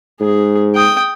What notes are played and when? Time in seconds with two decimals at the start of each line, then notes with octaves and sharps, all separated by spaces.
0.20 G#2 G#4
0.75 G5 D#6